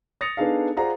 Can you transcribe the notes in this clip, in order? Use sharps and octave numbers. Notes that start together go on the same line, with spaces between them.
D#6 A6 A#6 C#7 F7
B3 D4 D#4 G#4 A4 F5
F4 G#4 C5 D5 F#5 A#5